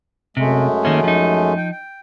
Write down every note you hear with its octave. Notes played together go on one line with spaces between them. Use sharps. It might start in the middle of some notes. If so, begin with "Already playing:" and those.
F#2 C3 G#3 A3
D#3 A#3 C#4
F3 D#4
G5
G5